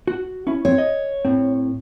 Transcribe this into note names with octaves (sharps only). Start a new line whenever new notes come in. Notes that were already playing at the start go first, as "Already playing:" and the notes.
F#4
C#4 E4
C4 C#5
D#5
A2 C4